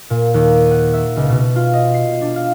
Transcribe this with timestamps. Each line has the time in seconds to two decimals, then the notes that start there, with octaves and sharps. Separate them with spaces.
0.10 A#2
0.34 D#2
0.58 D#7
0.71 F#5
0.94 E5
1.16 C#2
1.30 B2
1.56 F4
1.73 D#5
1.94 C7
2.21 D4
2.36 F5